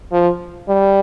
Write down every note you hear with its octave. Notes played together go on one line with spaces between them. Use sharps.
F3
G3